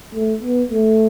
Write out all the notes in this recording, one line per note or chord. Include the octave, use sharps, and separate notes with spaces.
A3
B3
A3